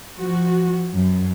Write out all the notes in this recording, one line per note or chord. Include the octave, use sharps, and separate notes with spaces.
F3 F#4
F#2